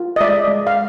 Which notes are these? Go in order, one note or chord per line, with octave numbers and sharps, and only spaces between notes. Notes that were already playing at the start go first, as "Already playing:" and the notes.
Already playing: F4
D#5
G#3 D5 E5
G#3
F5